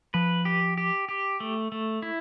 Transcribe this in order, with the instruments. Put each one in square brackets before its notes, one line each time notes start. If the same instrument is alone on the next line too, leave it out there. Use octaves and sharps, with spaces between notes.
[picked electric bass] F3 [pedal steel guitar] B4
[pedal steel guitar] G4
G4
G4
A3
A3
E4